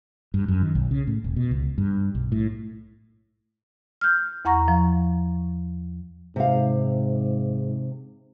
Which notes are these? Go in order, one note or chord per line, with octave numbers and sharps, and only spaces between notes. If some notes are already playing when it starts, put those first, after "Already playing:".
G2
F#2
D#3
B1
C#3
A2
E1
B2
C#2
G2
B1
A2
F6 G6
E2 F#5 A#5 C#6 A#6
F3
G#2 C3 F5